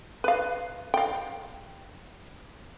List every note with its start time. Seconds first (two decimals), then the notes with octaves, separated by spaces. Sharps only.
0.24 B4 F5
0.94 F5 G5